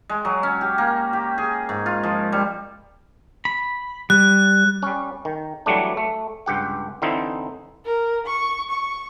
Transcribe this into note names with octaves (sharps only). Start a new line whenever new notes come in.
G#3
F#3
C#4
G4
A#3
G4
G#4
G#2
F4
F3
G3
B5
G3 F#6
G3 C#4
D#3
E3 F#3 G3 A3 D4
A3
C#2 G2 G4 F#5
D3 E3 C4 D#4 E4
A#4
C#6
C#6